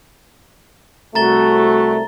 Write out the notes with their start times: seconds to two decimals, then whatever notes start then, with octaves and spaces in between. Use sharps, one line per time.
1.15 C2 A3 F#4 A#5 A6 G7